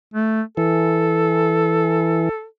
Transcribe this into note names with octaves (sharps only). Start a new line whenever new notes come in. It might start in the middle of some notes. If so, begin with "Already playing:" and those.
A3
E3 A4